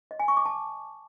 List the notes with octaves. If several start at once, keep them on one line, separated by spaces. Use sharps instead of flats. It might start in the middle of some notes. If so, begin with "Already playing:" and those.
D#5
G#5
C#6
D6
A5